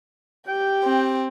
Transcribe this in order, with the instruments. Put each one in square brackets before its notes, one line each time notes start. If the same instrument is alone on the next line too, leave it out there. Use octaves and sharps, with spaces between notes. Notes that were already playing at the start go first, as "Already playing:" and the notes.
[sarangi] G4 [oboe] G5
[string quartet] C4